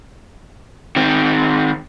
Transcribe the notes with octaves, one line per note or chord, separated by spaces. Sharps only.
D#3 C4